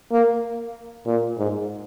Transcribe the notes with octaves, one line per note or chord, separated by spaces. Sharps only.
A#3
A#2
G#2